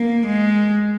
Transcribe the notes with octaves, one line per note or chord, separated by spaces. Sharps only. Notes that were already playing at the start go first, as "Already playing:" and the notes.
Already playing: A#3
G#3